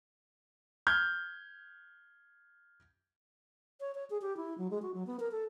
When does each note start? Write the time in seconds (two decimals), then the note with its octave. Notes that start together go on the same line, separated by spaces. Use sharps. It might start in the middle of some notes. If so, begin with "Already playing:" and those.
0.87 F6 G6 G#6
3.80 C#5
3.95 C#5
4.10 G#4
4.22 G4
4.37 E4
4.58 F#3
4.71 G#3
4.82 F#4
4.94 F#3
5.07 B3
5.20 A#4
5.31 A4